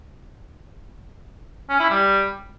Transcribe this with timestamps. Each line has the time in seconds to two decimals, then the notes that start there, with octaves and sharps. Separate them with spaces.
1.69 C#4
1.80 E4
1.90 G3